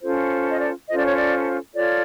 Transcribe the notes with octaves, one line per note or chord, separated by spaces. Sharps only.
C#4 F4 A4 C5
D#5
D5
C#4 F4 A4 C5 D#5
D5
C#5
D5
F4 A4 C#5 D5